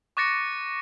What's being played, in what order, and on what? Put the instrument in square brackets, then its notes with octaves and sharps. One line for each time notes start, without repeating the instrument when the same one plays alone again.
[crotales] C#6 D6 F#6 A6 A#6 C#7